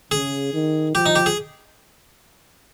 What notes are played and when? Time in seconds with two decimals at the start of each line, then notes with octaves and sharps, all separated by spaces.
0.11 C#3 G#4
0.54 D#3
0.95 F3 G4
1.06 D#4
1.16 G4
1.26 G#4